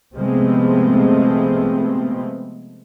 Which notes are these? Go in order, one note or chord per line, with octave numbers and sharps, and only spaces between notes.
C3 F3 G#3 A3 B3 C4